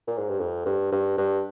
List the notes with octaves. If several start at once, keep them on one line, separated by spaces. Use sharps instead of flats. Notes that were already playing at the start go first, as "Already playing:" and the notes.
A#2
G#2
G2
F2
G2
G2
G2